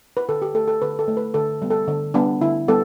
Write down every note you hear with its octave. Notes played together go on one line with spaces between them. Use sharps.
B4
D3 A4
G4
A3 A4
A4
D3 B4
A4
A3
B4
D3 A4
G3 B3
A4
D3
G3 B3 D4
D3 E4
G3 B3 A4